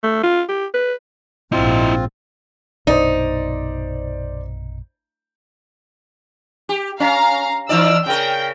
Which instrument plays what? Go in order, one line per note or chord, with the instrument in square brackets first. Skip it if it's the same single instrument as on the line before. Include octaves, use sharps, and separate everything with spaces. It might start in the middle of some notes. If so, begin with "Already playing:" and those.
[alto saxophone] A3
F4
G4
B4
[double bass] A#1 G#2 [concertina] C4 F4 [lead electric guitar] E4 D#5
[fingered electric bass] A#1 F#2 B2 [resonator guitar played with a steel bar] D#4 [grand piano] C5 D5
[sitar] G4
[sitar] C#4 [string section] F5 A#5
[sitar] E3 D#4 D5 [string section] E6 F6
[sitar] C#3 A#4 [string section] G5